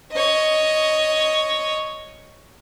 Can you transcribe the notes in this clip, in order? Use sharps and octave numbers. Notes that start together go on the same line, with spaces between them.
C#5 D#5